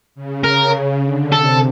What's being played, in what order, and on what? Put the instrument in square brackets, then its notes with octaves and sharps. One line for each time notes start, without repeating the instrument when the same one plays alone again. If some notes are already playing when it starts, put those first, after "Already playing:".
[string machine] C#3
[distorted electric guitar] A#4
[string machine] D3
[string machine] C3 [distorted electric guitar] A4